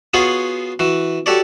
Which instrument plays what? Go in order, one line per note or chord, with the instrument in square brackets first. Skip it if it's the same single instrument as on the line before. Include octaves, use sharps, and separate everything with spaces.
[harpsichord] B3 F4 F#4 G#4 C#5 F#5
E3 F#4
F#4 G4 A4 C#5 D5